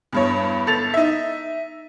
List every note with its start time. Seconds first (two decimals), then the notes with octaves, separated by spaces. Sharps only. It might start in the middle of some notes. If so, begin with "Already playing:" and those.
0.12 E2 G2 C#5
0.67 G1 A4 A6 F7
0.94 D#4 E5